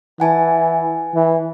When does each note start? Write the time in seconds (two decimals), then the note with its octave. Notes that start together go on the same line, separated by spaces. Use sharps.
0.20 E3 F#5 G#5 A5
1.14 E3